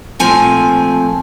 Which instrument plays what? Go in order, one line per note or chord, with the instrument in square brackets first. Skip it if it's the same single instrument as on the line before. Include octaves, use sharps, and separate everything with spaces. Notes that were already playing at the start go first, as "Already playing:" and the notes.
[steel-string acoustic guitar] A#2 F3 A3 C4 G#5